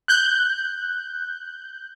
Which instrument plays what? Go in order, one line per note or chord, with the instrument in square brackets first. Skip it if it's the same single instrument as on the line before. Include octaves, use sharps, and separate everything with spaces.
[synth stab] F#6 G6